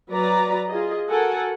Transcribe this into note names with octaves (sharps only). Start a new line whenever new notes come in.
F#3 B4 D5 A#5
F4 G#4 D#5
F#4 A4 A#4 F#5 G#5